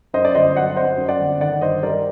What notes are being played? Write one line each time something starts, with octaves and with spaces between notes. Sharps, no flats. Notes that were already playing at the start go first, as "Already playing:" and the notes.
F#2 C5 D#5
D5
G1 C5 D#5
F#3 D5 F#5
F#5
C4 C5 D#5
F#2
D5 F#5
G1
D#3 D5 F#5
G2 C5 D#5
G3 A#4 D5